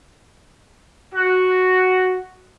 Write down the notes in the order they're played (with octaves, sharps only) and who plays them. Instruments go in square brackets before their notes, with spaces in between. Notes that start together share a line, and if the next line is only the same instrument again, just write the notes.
[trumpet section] F#4